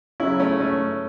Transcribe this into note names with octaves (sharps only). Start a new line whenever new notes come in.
C#3 F#3 C#4 E4
A3 C#4
A3 C#4